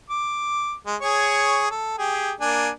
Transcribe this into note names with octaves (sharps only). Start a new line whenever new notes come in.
D6
G#3
G#4 C#5 C#6
A4
G4 G#4
A#3 D4 G#5